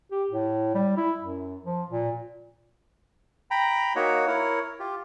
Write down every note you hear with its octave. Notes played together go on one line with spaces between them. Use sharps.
G4
A2
G3
E4
F#2
F3
A#2
G5 A#5 B5
A#3 D#4 F#4 C#5
E4 A#4 C#5
F4 G4